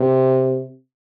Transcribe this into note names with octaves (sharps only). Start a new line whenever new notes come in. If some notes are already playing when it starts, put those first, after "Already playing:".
Already playing: C3